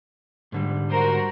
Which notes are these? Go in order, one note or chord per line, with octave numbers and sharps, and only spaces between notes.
G#2 D3 G3
F#4 A#4 C5